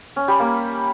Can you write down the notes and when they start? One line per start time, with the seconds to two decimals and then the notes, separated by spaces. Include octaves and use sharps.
0.16 C#4
0.28 G3
0.40 A#3